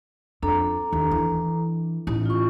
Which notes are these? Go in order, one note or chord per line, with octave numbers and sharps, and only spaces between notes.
F2 D4 A4 A#5
D#2
E3
A1 D#4
F4 C#6